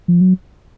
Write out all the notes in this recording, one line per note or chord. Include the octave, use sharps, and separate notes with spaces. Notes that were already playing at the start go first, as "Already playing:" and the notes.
F3
F#3